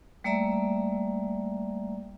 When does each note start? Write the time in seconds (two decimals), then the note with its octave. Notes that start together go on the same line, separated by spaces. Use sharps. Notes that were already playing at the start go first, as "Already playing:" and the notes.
0.24 G3 A3 A#3 D5 E5 A#5